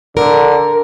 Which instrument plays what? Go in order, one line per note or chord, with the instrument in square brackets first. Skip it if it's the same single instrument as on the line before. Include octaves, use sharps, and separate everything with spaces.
[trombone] D3 [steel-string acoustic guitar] A#4